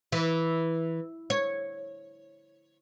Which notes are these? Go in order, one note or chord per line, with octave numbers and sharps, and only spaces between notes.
E3
C#5